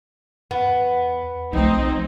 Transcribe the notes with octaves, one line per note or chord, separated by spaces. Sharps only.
E2 B3
B1 F3 A3 C4 D#4 D#5